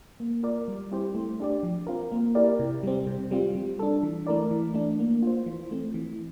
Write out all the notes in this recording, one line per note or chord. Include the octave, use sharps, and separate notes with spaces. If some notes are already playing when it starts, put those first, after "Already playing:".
A#3
F4 A#4 D5
G3
C4 E4 G4 C5
A3
D4 G4 D5
F3
C4 F4 A#4
A#3
E4 G4 A#4 D5
C3
G3 C4
C3
G3 C4 F4
G3
D4 A4
E3
A3 E4 A#4 D5
E3
A3 D4
A#3
F4 C5
E3
A3 C4
E3